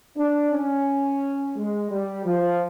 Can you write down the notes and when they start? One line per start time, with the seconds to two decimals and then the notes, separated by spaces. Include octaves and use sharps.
0.17 D4
0.52 C#4
1.56 G#3
1.91 G3
2.25 F3